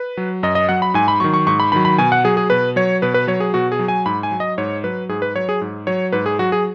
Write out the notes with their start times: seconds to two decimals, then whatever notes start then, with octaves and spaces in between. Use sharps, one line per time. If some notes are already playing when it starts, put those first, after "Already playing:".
Already playing: B4
0.17 F#3
0.43 F#2 D#5
0.55 D#5
0.69 F#3 F#5
0.82 B5
0.94 G#2 G#5
1.08 B5
1.20 D#3 F#3 C#6
1.34 C#6
1.47 G#2 C#6
1.60 B5
1.72 D#3 F#3 B5
1.85 B5
1.98 B2 G#5
2.12 F#5
2.24 F#3 G#4
2.37 G#4
2.50 B2 B4
2.76 F#3 C#5
3.02 B2 B4
3.14 B4
3.27 F#3 C#5
3.40 G#4
3.54 B2 F#4
3.72 G#4
3.79 F#3
3.88 G#5
4.06 G#2 B5
4.23 G#5
4.31 F#3
4.40 D#5
4.58 G#2 C#5
4.84 F#3 B4
5.09 G#2 G#4
5.22 B4
5.36 F#3 C#5
5.49 G#4
5.61 G#2
5.87 F#3 C#5
6.12 G#2 B4
6.26 G#4
6.39 F#3 F#4
6.52 G#4